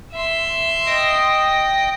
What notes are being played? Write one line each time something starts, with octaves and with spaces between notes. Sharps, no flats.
E5 C6
D#5 G5 D#6